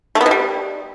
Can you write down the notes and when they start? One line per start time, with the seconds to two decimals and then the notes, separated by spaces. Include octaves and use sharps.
0.15 A3
0.21 B3
0.26 B2
0.31 G3